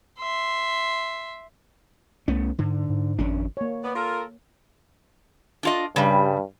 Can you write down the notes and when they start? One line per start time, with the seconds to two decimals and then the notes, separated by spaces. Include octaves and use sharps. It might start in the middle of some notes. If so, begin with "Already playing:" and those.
0.19 E5 C6
2.28 C2 A3 B3 C#4
2.58 G#2 D3
2.90 G#2
3.19 G#1 F2 C#4 D4
3.57 A#3 C#5
3.83 B3 D5
3.95 F4 A4 A#4
5.63 D4 F4 D#5
5.96 G2 C#3 G3